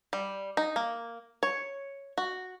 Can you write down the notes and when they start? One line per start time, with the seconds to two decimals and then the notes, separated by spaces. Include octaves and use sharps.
0.13 G3
0.57 D#4
0.76 A#3
1.43 C#5
2.18 F#4